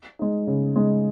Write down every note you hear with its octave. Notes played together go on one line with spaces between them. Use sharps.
G#3 D#4
C#3
G#3 D#4